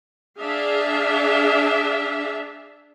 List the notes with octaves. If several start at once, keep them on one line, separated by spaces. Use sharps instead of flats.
D4 G#4 E5 F5